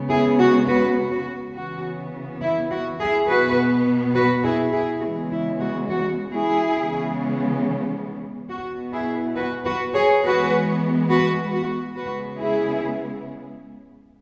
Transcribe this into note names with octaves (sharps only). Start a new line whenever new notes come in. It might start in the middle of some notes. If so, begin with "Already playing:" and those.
Already playing: C#3 G#3 B3
E4 G#4
F#4
F#4 B4
F#4
C#3 E3 B3 F#4
E4
F#4
E4 G#4
B2 B3 F#4 B4
F#4 B4
E4 G#4
E4 G#4
C#3 E3 G#3 B3 F#4
E4
F#4
F#4
E4 G#4
C#3 E3 G#3 B3
B2 B3 F#4
E4 G#4
F#4 B4
F#4 B4
G#4 C#5
E3 G#3 B3 F#4 B4
F#4 B4
F#4
C#3 G#3 B3 F#4 B4
E4 G#4